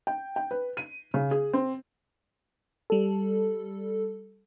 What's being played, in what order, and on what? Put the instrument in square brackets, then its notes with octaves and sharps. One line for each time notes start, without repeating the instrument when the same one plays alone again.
[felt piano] G5
G5
B4
D#7
C#3
G#4
C4
[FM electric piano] G3 A4